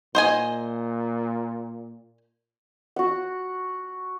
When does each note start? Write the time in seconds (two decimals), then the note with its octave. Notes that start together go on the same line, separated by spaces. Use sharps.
0.15 A#2 C5 D#5 G#5
2.96 F#4 F#5